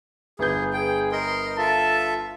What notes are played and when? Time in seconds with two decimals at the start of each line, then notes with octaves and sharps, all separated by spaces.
0.39 G1 G#4 B4 G6
0.73 G#4 G5
1.12 A#4 D#5 C6
1.58 F4 A4 E5 A5